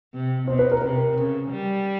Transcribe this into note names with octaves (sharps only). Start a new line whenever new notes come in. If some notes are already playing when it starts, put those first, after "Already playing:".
C3
B2 C5
B4
A#4
C3 A#4
C#3
G3